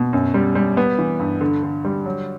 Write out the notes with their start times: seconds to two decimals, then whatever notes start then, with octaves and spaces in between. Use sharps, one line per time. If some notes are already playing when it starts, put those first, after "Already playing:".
Already playing: B2
0.13 F#2
0.34 G3
0.55 G3
0.77 B3
0.99 E3
1.19 G2
1.41 D3
1.63 D3
1.85 G3
2.06 F#3